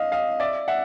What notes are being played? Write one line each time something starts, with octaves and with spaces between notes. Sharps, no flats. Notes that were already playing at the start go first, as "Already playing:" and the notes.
Already playing: D#5 F5
D#5 F5
D5 E5
E5 F#5